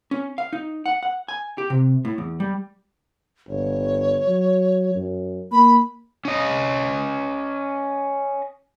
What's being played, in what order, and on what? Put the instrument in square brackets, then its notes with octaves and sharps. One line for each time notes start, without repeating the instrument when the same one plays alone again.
[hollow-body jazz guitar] C#4
F5
D#4
F#5
F#5
G#5
G4
C3
A2
E2
G3
[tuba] G1 [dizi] C#5
[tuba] F#3
F#2
[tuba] A#3 [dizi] B5
[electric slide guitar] C#4 D#5